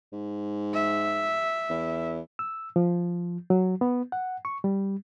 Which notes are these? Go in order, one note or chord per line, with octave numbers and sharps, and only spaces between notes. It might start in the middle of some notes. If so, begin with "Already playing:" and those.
G#2
E5
E2
E6
F3
F#3
B3
F#5
C#6
G3